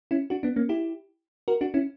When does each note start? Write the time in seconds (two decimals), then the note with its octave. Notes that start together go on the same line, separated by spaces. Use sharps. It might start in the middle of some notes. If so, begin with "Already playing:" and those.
0.11 C#4 E4
0.30 D4 F#4
0.43 B3 D4
0.56 A#3 C#4
0.69 E4 G4
1.48 F#4 A#4
1.61 D4 F#4
1.74 C#4 E4